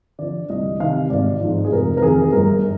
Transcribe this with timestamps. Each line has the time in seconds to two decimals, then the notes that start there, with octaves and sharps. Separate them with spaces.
0.18 D3 F3 D5
0.50 C2 D#5
0.80 C3 D#3 F5
1.10 G#1 D5
1.41 G#2 F3
1.65 G#4
1.72 F1 A#4
1.97 A#4
2.02 F2 D#3 G#4
2.32 G1 A#4